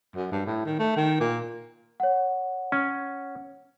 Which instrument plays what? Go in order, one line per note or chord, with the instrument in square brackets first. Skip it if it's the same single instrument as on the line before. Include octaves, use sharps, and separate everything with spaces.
[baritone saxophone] F#2
G2
A2
D#3
A3
D#3
A#2
[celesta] C#5 F#5
[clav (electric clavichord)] C#4